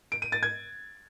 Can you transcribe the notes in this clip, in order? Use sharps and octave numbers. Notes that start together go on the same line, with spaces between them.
D7
D#7
A6
G#6